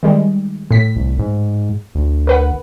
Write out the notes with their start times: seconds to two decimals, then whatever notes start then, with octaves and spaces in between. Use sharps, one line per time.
0.03 D#3 G3 G#3
0.71 A2 B6
0.96 C2
1.19 G#2
1.95 D2
2.27 A#4 B4 F#5